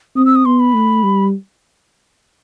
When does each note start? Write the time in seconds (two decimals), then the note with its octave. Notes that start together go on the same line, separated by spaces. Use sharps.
0.16 C4 D#6
0.26 E6
0.35 D#6
0.45 B3 C6
0.60 B5
0.74 A3
1.03 G3